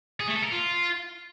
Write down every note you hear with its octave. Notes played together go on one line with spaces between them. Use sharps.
G#4
A3
A4
A#4
F4